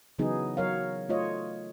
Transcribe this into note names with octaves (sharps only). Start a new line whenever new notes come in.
C#3 E3 F#3 B3 D#4 G#4
F#3 A#4 C#5 F5
A3 F4 C#5 D#5